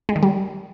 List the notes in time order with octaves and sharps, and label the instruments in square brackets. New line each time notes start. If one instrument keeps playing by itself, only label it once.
[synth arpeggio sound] G#3
D#3
G3